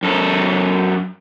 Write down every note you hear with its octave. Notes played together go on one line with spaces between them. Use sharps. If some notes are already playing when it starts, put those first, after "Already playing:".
F#2 A4